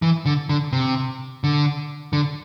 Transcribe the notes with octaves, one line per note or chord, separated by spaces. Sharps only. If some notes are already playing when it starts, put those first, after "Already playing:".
E3
D3
D3
C3
D3
D3